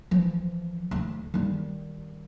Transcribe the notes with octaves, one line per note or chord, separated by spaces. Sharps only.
E3 F3
D2
D#3 G3